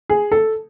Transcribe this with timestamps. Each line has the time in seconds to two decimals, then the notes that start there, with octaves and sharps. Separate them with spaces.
0.10 G#4
0.32 A4